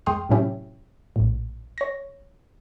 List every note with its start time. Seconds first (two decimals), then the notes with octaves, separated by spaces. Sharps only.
0.06 F2 G#3 G5 C6 D#6 F6
0.29 A2 C3 F#3 C#4 E4 G4
1.16 A#1 A2
1.78 C#5 A#6